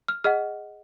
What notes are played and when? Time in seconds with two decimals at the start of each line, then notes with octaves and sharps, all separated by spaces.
0.08 F6
0.24 G#4 D#5 F#5 F6